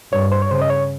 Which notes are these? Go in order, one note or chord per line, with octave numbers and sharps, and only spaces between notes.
G2 C#5
C5
C#5
C#3 C5
D#5
C#5